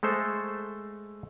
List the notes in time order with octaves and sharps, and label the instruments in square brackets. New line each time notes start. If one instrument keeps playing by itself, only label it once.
[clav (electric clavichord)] G#3 A3 A4 C5